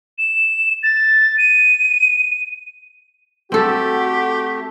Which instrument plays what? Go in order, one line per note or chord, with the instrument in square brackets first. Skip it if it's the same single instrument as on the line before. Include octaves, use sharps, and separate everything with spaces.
[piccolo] E7
A6
D#7
[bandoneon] A3 [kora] C4 A4 [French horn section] F#4 [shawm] G4